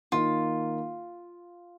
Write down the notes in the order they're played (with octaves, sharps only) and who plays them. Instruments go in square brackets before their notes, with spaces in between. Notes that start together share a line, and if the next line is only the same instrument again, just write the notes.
[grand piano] D#3 A#3 D#4 A#4 [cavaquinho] F4